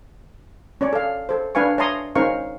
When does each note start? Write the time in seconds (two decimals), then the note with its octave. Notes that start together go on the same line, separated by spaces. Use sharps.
0.81 C#4 C#5 D5
0.93 A4 F5
1.29 A4 C5
1.55 D4 B4 F5 G#5 C#6
1.78 C#5 E5 A5 A#5 C6 D#6
2.15 C#4 D#4 A#4 C5 F5 C#6